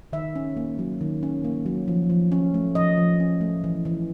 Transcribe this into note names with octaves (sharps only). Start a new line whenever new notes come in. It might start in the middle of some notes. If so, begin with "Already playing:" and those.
D#3 E5
C#4
A#3
F#3
D#3
C#4
A#3
F#3
F3
F3
C#4
A3
F3 D#5
F3
C#4
A3
E3
E3